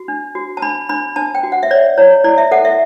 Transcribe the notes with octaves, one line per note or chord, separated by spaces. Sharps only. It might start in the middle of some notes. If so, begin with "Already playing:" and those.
Already playing: F#4
D4
F#4
A5
D4 B5
D4 B5
D4 A5
G5
F#4
F#5
E5
C#5 D5
E4 C#5
E4 D5
E5
A4 F#5
E5